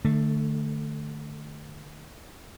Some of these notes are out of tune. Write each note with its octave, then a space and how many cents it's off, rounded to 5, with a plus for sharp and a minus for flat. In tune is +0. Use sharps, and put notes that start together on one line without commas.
D3 +30 A3 +5